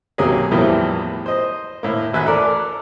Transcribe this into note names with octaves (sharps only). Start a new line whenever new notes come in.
B1 C3 F#3 A#3 G#4
E2 A2 E3 F3 G3 A#3
C5 D#5
A2 A#3
A1 E5 G#5 F#6
A4 A#4 D5